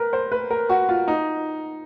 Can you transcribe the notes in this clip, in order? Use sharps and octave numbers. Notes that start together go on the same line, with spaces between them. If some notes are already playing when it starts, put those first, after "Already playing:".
Already playing: A#4 B4
C5
B4
A#4
F#4
F4
D#4